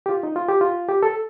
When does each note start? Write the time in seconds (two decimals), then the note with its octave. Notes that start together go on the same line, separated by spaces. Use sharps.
0.06 G4
0.09 F4
0.23 D#4
0.36 F4
0.49 G4
0.61 F4
0.89 G4
1.03 A4